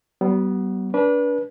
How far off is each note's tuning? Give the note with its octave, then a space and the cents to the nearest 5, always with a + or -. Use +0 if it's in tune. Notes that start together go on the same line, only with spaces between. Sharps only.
G3 -40 B3 +0
D4 -25 B4 -30